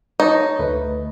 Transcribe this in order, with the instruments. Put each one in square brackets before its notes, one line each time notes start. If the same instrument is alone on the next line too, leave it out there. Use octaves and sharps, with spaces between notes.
[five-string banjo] D#4 [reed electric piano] C#5 A5 C#6
[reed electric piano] D2 A3 B4